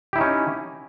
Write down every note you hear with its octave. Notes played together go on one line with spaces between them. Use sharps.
C#4 D#4 E4 G4